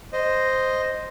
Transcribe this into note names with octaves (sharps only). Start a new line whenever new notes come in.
C5 D#5